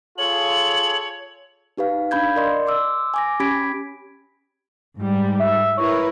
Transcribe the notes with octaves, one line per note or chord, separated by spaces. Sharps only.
F4 G#4 A4 C#5 F#7
D#4 G4 B4 F5
D4 F5 B5 G6 G#6
A#4 D5 D#5 C6
C6 D6 E6
G#5 D6 A#6
C#4 G4 B5 G#6 B6 D7
G#2 G3
E5
E4 A#4 B4 C#5